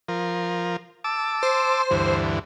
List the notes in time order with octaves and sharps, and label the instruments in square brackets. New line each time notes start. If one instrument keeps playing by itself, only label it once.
[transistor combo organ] F3 A#4
A5 D6 E6
[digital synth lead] C5
[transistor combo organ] D2 G2 E3